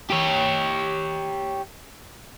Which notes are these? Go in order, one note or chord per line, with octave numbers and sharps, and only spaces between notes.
G4 C#5